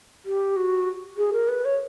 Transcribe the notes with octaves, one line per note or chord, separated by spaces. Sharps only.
G4
F#4
G#4
A#4
B4
C#5